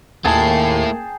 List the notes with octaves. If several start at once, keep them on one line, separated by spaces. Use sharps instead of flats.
D#2 A3 A#3 E4 G#4 G5 A5 C7